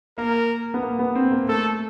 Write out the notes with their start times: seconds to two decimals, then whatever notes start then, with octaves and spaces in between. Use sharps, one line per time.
0.18 A#3 A#4
0.74 B3
0.82 A#3
0.99 B3
1.15 C4
1.32 A#3
1.48 A3 A4